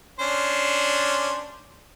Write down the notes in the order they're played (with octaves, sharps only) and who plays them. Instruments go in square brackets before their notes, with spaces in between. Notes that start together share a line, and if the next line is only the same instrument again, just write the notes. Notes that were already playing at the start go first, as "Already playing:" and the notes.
[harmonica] C#4 D4 C5